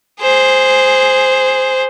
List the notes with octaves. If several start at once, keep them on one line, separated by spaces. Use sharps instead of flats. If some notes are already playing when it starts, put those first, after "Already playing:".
G#4 C5